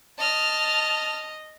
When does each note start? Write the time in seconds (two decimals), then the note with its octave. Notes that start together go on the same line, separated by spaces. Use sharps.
0.18 D#5 A5 F6